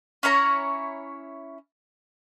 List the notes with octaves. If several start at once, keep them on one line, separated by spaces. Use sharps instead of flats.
C#4 E4 C#5 A#5